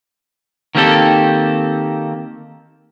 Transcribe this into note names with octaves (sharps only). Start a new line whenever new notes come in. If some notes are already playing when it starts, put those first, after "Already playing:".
D#3 A#3 C4 G4 A4